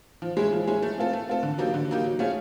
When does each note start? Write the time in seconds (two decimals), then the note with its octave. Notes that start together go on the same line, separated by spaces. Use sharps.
0.22 F3
0.37 G#3 C#4 E4 G#4
0.53 F3
0.67 G#3 C#4 E4 G#4
0.83 A3
0.98 C4 F4 A4
1.13 A3
1.28 C4 F4 A4
1.43 D3
1.58 F#3 A#3 D#4 G4
1.74 D3
1.89 F#3 A#3 D#4 G4
2.04 F#3
2.19 A3 C#4 F4 G#4